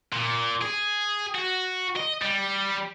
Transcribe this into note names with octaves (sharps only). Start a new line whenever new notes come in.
A#2
G#4
F#4
D#5
G3